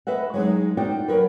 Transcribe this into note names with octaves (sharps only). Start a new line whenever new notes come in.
B4 D#5 E5 F#5
F#3 G#3 D#4
D#4 F4 F#4 D5 G5
F#3 A#4 B4